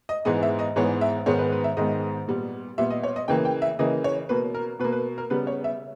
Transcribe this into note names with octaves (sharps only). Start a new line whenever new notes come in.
D#5
G#2 E3 G#3 B3 D#5
E5
D#5
G#2 E3 G#3 B3 C#5
E5
G#2 D#3 G#3 B3 C#5
B4
B4
E5
G#2 D#3 G#3 B3 D#5
A#2 G3 B3
A#2 G3 B3 E5
D#5
C#5
D#5
C#3 E3 A#3 G5
G5
E5
C#3 E3 A#3 D#5
C#5
B2 A#3 B4
A#4
B2 A#3 B4
B4
A#4
C#3 G3 B3 B4
C#5
E5